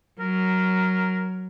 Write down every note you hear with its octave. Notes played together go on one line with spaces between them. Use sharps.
F#3 A#4